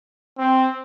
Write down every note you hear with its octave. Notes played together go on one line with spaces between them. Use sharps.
C4